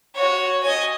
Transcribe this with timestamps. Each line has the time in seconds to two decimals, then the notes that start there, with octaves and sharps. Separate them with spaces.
0.15 F#4 C#5
0.63 D#5 G#5